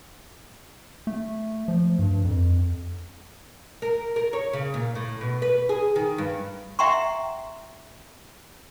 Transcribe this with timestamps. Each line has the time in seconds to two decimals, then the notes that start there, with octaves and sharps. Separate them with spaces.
1.07 A3
1.68 F3
1.99 G2
2.25 F2
3.82 A#4
4.16 A#4
4.33 C#5
4.53 C#3
4.74 A#2
4.95 A2
5.21 B2
5.42 B4
5.69 G#4
5.96 D#3
6.18 G2
6.79 E5 F#5 G5 A#5 C6 C#6